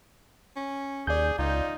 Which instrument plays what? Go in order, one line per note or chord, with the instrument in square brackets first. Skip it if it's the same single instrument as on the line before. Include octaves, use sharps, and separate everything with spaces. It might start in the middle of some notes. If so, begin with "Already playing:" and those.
[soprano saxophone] C#4
[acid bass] D#2 [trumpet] G#4 [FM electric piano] D5 G6
[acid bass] C#2 [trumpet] D#4 [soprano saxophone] F4